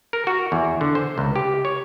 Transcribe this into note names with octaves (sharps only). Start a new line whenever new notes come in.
A#4
F#4
E2
D3
C5
C#2
G4
C#5